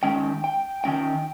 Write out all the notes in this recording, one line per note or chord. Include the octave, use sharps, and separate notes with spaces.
D#3 G#3 C#4 G5
G5
D#3 G#3 C#4 G5